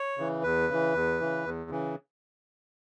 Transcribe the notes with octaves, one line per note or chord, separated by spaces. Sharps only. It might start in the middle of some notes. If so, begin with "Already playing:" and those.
Already playing: C#5
C#3 E3
E2 B4
C#3 E3
E2
C#3 E3
E2
C#3 E3